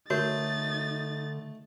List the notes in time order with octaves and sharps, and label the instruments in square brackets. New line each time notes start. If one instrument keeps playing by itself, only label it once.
[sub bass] D3 [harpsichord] A3 [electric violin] D#4 A6 [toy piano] F#4 A#4 C#5